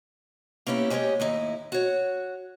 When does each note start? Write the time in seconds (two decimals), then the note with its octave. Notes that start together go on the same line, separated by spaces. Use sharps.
0.67 A#3 B3 C#4 E4 G4
0.90 G#3 G4 A#4 C5 C#5 D#5
1.20 D#2 A2 D#4 E4
1.72 F#4 C#5